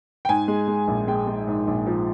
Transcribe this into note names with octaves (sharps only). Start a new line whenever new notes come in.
G5
G#2 G#5
G#3
G#3
A#1
G#3 G5
G#3
G#2
A#1
F3